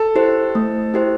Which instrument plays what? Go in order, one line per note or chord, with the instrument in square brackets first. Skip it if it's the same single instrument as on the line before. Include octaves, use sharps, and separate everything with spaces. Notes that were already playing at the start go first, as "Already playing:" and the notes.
Already playing: [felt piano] A4
[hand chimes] E4 G4 C5
A3
E4 G4 C5